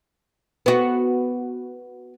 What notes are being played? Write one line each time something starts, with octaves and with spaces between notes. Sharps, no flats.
B3 F#4